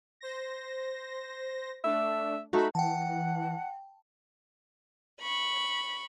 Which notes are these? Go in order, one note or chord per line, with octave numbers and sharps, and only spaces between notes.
C5 A#6
A3 D4 E5
A3 D#4 F#4 E5 B5
E3 F#5 G5 A5
B5 C#6